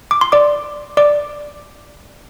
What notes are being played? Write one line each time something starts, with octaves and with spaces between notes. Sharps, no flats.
D6
C6
D5 D6
D5 D6